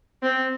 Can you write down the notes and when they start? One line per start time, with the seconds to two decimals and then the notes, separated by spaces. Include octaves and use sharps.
0.22 C4